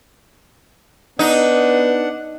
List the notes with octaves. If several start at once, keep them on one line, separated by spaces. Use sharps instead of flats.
B3 D4 D#4 F#5